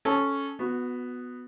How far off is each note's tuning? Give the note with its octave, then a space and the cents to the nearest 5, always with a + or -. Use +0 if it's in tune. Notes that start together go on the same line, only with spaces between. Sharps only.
C#4 +0 A4 -15
B3 +5 F#4 -20